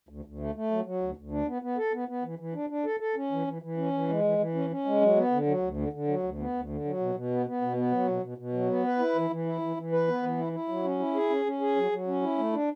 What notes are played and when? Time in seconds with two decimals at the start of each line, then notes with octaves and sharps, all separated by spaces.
0.09 D2
0.25 D2
0.39 A3
0.55 A3
0.71 F#3
0.85 F#3
1.02 D2
1.17 D2
1.32 D4
1.47 B3
1.62 B3
1.77 A4
1.93 B3
2.08 B3
2.24 E3
2.39 E3
2.54 D4
2.70 D4
2.85 A4
3.00 A4
3.16 C#4
3.32 E3
3.47 E3
3.62 E3
3.77 C#4
3.93 E3
4.09 G#3
4.24 E3
4.39 E3
4.55 C#4
4.70 C#4
4.85 G#3
5.01 F#3
5.16 B3
5.31 D3
5.47 F#3
5.62 D2
5.77 D3
5.93 D3
6.07 F#3
6.23 D2
6.38 B3
6.54 D2
6.69 D3
6.85 F#3
7.00 B2
7.15 B2
7.30 B3
7.46 B3
7.61 B2
7.77 B3
7.92 F#3
8.08 B2
8.23 B2
8.38 B2
8.53 F#3
8.69 B3
8.84 B4
8.99 E4
9.15 E3
9.30 E3
9.46 E4
9.61 E3
9.77 E3
9.92 B4
10.08 B3
10.23 E3
10.37 E4
10.53 E4
10.68 F#3
10.84 C#4
10.99 E4
11.14 G#4
11.30 C#4
11.45 C#4
11.60 G#4
11.76 F#3
11.91 F#3
12.07 C#4
12.22 E4
12.38 A3
12.53 D4